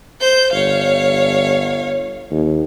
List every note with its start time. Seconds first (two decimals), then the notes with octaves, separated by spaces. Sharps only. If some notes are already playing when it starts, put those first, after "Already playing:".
0.21 C5 G6
0.52 G1 C#5 F5
2.31 D#2